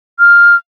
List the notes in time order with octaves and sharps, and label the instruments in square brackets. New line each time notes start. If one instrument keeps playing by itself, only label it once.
[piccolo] F6